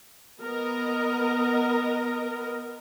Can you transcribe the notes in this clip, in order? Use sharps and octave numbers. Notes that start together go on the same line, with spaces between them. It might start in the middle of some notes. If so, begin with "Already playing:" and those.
B3 A#4 D#5